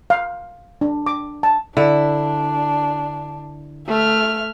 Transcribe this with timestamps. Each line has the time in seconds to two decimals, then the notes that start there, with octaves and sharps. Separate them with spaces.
0.10 F5
0.81 D4
1.06 D6
1.43 A5
1.77 D3 D4 E4
3.88 A3 E5 F6